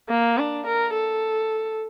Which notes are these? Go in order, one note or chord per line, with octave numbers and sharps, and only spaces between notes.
A#3
D4
A#4
A4